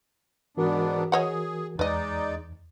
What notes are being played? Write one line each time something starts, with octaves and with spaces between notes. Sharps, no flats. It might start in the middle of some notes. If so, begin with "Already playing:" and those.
G#2 E3 B3 D4 F#4 A#4
G#4 C#5 D#5 F#5
E2 G#3 D#4 B4 D5 D#5